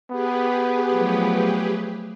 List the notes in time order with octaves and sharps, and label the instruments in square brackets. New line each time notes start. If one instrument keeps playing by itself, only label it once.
[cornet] B3 [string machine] G4 G#4 B4
[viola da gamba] F3 F#3 A3